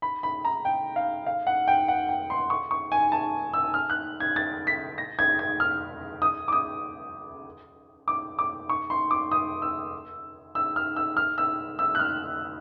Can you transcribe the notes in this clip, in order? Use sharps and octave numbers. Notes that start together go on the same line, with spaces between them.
B5
B5
A#5
G5
F5
F5
F#5
G5
F#5
G5
C6
C#6
C#6
G#5
A5
E6
F6
F#6
G#6
A6
B6
A#6
G#6
G#6
F6
D#6
D6
D#6
D6
D6
C#6
C6
D6
D#6
E6
E6
F6
E6
F6
E6
E6
F#6
F6